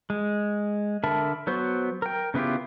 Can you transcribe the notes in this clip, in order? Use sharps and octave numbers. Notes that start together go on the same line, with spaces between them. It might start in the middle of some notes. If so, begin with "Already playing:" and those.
G#3
D3 A#4 E5 A5 B5
F#3 B3 F#4 C5
A#4 G5
C#3 B3 E4 F4 G4